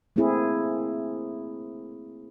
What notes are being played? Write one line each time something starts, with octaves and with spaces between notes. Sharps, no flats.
A3 A#3 C4 E4 G#4